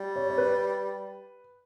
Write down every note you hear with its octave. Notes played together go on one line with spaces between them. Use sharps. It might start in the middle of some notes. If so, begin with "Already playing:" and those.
Already playing: G3
C#5
C#5
B4